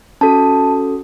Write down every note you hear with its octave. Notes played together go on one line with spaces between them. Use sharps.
C#4 F#4 A4 A5